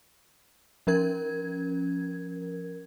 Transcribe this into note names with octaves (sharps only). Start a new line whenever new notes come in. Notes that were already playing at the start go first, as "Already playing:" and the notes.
F3 C#4 A#4 G#6